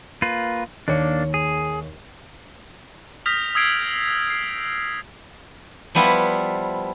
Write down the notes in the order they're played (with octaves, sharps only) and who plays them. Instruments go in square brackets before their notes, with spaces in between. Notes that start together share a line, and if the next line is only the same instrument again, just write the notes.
[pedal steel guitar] A#3 F4 B4
[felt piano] D#2 C#5 C#7 [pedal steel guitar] A#3 D4
[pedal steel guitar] G#4
[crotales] D#6 F6 G6 A#6 B6 F7
D#6 E6 G#6 C7 D7
C7
[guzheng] F3 G3 B3 E4 F4 B4